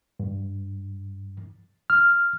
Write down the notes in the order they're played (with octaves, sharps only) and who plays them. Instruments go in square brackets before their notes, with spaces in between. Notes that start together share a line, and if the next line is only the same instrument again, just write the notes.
[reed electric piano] G2
F6